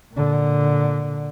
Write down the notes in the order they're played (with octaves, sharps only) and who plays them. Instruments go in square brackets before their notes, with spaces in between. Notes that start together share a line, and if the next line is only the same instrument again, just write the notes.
[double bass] A#2 D3